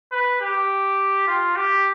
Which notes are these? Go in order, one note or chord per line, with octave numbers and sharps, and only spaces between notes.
B4
G4
F4
G4